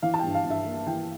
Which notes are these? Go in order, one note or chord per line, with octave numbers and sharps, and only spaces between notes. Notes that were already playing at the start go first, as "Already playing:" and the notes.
E3 F5
A5
G2 G5
F5
G2
E5
A#3
E3 G5